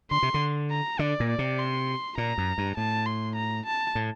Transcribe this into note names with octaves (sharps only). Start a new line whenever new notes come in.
D3 C6
C3
D3
A#5
D3 D5
A#2
D5
C3
C6
A#2 A#5
F#2
G2
A2 A5
C6
A#5
A5
A2